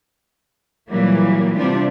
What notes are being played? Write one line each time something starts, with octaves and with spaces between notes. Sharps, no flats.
A#2 E3 F#3 G3 A#3
C3 G3 D4 F4